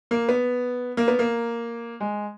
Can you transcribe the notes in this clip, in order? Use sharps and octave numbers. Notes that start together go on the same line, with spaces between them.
A#3
B3
A#3
B3
A#3
G#3